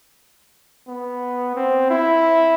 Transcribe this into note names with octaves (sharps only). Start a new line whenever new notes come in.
B3
C4
E4